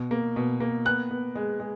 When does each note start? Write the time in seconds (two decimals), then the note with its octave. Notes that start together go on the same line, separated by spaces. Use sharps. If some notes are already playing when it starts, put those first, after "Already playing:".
Already playing: B2
0.11 A#3
0.36 B2
0.60 A#3
0.85 B3 F#6
1.11 B3
1.35 G#3
1.60 G#3